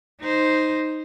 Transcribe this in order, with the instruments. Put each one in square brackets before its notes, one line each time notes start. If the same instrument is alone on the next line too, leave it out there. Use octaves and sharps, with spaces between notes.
[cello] D#4 C5